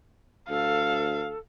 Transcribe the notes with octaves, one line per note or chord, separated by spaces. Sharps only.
D2 A4 F5